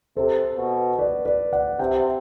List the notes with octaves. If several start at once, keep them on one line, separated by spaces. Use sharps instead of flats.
C3 A4 C5
B2
B4 D5
B4 D5
D5 F#5
C3 E5 G5